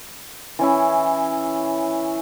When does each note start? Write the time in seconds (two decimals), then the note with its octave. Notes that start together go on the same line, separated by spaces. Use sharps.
0.59 E3 C#4 E4